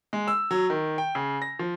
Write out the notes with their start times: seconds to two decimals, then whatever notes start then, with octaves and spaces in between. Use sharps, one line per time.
0.13 G#3
0.28 E6
0.51 F#3
0.70 D#3
0.98 G5
1.15 C#3
1.42 A#6
1.59 F3